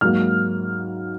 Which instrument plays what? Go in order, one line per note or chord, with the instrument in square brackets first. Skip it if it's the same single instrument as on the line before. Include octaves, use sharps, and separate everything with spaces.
[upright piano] G#2 F#3 A#3 F6